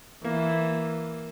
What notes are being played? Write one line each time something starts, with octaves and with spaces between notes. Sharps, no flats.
E3 A#3